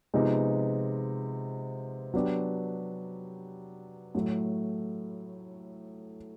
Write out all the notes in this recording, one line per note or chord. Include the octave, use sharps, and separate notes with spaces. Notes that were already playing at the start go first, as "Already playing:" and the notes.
C3 F3 G#3 B3 D#4
F#3 B3 D4 G4
A2 F#3 A3